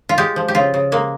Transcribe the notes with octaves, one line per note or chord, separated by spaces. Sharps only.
F4
G#3 G4
F3
G4
C#3 F4
C#3
G#3 A#3